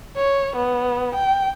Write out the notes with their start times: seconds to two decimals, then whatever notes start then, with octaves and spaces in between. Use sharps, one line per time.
0.17 C#5
0.56 B3
1.15 G5